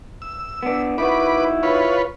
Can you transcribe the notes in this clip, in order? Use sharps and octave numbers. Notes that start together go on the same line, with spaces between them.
E6
B3 D4
D#3 E4 F#4 B4 D6
F4 B4 C#5